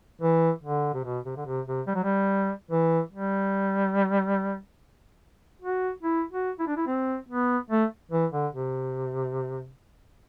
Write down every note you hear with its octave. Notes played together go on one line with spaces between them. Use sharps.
E3
D3
C3
B2
C3
D3
C3
C3
G3
F#3
G3
E3
G3
F#4
E4
F#4
E4
D4
E4
C4
B3
A3
E3
D3
C3